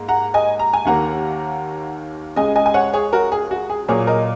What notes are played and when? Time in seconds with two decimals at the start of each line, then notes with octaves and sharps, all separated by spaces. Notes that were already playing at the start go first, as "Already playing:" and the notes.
Already playing: G#2 A#3
0.08 F#5 A#5
0.34 D#5 G#5
0.59 A#5
0.74 G#5
0.85 D#2 D#3 A#3 F#5 A#5
2.36 C#2 C#3 G#3 D#5 G#5
2.55 D#5 G#5
2.66 G#5
2.74 C#5 F#5
2.93 G#4 C#5
3.13 F#4 A#4
3.32 G#4
3.51 F#4
3.70 G#4
3.88 A#2 F#3 A#3 G#4 C#5
4.07 A#4 D#5